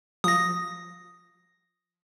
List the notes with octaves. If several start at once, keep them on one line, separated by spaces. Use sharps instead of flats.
F3 D#6 A#6